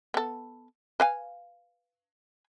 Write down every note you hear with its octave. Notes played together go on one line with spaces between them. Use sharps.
B3 A4
B4 F5 G#5